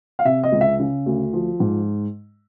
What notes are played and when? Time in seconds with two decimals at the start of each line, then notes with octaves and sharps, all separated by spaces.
0.19 F5
0.25 C3 E5
0.43 D#5
0.52 C#2
0.61 E5
0.80 C#3
1.06 D2
1.33 F3
1.60 G#2